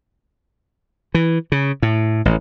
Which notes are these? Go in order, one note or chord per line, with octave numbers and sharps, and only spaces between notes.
E3
C#3
A2
A1